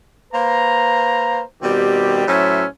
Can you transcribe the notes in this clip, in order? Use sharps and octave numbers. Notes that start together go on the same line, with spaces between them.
A#3 B4 C5 A#5
B2 D#3 G3 C4 G4
A2 F#3 C#4 C5 E5